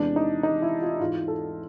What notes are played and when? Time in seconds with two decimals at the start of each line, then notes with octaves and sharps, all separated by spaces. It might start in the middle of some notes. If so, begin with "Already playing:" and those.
Already playing: E2 C3 E3 G#3 B3 D4
0.16 D#4
0.43 D#4
0.62 E4
0.82 F4
1.00 G#2 E3 G#3 F4
1.28 A4